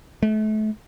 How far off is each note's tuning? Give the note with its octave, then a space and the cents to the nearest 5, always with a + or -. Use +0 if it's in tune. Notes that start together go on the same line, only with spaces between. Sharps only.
A3 -35